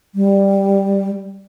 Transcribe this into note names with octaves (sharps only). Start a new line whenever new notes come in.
G3